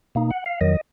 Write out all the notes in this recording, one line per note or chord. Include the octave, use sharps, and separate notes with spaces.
B2 A#3 D#4
F#5
F5
F2 D#3 F#3 D#5